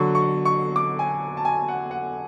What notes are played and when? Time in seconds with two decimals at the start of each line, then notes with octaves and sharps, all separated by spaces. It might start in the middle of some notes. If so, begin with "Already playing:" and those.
Already playing: D3 F#3 C#6
0.15 C#6
0.45 C#6
0.76 D6
0.99 G#5
1.37 A5
1.45 G#5
1.68 F#5
1.91 F#5